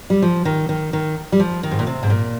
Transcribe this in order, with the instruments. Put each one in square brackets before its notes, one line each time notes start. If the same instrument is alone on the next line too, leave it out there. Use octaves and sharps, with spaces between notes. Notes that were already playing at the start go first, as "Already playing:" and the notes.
[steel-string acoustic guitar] G3
F3
D#3
D#3
D#3
G3
F3
D#3
G#2
A#2
C3
G#2
A#2